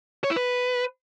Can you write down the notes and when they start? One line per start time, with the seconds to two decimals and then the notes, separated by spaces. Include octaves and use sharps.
0.24 C#5
0.30 E4
0.36 B4